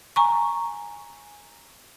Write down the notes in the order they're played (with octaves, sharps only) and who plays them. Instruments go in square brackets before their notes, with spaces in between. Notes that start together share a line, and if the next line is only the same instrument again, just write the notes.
[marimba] G#5 A#5 C#6